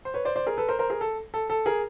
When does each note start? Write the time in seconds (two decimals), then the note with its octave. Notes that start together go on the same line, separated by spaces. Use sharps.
0.05 C5
0.14 B4 C#5
0.25 C5 D5
0.36 C5 D5
0.47 G#4 A#4
0.58 A4 B4
0.68 A#4 C5
0.79 A#4 C5
0.90 G#4 A#4
1.01 A4
1.34 A4
1.50 A4
1.66 G#4 A#4